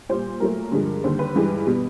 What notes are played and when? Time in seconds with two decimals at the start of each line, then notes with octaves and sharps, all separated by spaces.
0.09 A#2 G3 C5
0.40 A#2 F#3 A3 A#4
0.72 G2 D3 F3 G#3
1.04 D#2 D3 G3 C5
1.19 B4
1.35 G2 E3 G#3
1.66 B2 G3